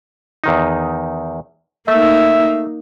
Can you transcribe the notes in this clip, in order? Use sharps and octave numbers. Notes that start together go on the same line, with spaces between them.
E2 D#3 D#4
A3 A#3 D#4 E5